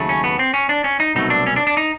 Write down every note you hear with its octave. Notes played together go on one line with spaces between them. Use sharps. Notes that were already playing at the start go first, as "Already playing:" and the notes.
Already playing: D#2 C#3 F#3 A3
C#4
B3
C4
C#4
D4
C#4
D#4
C2 B2 F#3 A3 D#4
D4
C#4
D4
D4
D#4